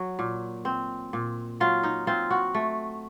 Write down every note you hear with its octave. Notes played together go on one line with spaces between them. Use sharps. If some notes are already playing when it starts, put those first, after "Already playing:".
Already playing: F#3 F#4
A#2
C4
A#2
F#3 F4
D#4
C4 F4
F#4
A3